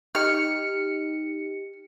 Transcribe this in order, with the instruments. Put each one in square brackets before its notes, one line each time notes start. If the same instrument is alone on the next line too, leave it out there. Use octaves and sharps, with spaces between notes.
[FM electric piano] D#4 G4 C#7 [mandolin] F6